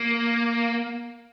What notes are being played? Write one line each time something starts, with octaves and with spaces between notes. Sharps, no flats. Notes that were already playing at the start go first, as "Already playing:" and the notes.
Already playing: A#3